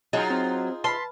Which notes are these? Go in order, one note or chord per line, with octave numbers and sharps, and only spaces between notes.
F#3 D#4 F4 G#4 D#5 A#5
C4
B4 A5 B5 C6 B6